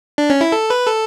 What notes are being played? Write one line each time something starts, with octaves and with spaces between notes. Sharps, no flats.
D4
C#4
E4
A4
B4
A4